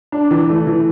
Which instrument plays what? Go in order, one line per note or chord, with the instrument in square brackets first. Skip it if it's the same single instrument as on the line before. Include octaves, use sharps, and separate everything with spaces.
[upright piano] D4
E3
A3
E3